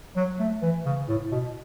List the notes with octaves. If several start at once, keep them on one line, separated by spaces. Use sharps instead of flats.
F#3
A3
E3
C#3
A2
B2